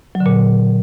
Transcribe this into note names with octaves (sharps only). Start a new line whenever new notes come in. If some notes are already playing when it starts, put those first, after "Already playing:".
F#3
D3
A#2